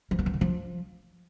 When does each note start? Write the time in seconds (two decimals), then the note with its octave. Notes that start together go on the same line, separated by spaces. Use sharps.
0.11 F3
0.19 B3
0.26 E3
0.34 D#3
0.41 F3